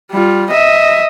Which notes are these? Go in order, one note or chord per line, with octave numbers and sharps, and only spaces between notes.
G3 F4
D#5 E5